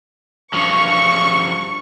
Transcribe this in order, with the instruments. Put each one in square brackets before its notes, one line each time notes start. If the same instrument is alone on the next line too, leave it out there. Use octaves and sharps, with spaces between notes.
[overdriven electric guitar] G2 F3 [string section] C#6